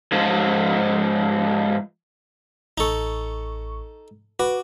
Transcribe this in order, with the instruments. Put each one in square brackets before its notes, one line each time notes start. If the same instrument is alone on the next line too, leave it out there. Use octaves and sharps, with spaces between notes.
[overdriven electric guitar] G#2 F3
[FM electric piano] A1 C#6 [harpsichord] D#4 A4
[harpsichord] F#4 [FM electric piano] B4 D6